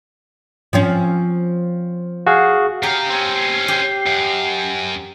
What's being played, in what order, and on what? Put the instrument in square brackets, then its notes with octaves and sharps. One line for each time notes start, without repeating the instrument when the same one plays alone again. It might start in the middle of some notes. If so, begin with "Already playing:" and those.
[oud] F3 C4 C#4
[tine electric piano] F#4 G#4 F5
[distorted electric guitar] C#3 F5 [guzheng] G4 [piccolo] A#5
[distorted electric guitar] C4 C#4
[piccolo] C7
[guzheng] G4
[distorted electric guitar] F#2